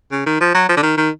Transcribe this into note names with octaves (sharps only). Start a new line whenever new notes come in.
C#3
D#3
F3
F#3
F3
D3
D#3
D#3